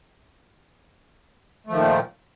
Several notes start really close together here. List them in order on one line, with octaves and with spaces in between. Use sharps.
A3 F3 D#3 A#2